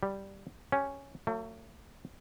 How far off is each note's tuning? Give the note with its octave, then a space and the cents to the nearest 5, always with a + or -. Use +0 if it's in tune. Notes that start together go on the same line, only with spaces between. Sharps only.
G3 +0 G4 +0
C#4 +0 G4 +0
F#3 +0 A3 +40